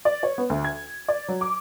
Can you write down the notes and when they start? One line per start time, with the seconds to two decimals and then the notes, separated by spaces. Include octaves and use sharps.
0.05 D5
0.23 C#5
0.38 B3
0.50 D2
0.65 G#6
1.08 D5
1.28 F#3
1.41 D6